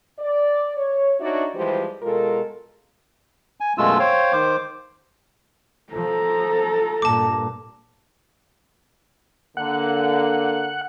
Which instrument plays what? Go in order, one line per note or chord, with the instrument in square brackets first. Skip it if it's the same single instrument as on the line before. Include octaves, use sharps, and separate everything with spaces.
[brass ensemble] D5
C#5
D4 D#4 F#4 C#5 D5 E5
E3 F3 G3 G#3 G4 C5
B2 G#3 F4 A4 A#4
[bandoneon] G#5
F#2 B2 G#3 A3 F4 E6
C5 C#5 F5 G5
D#3 C5 D6
[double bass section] F3 [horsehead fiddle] A4 A#5
[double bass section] G2 A#2 [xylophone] A5 D6
[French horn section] D3 A#3 [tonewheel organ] F#5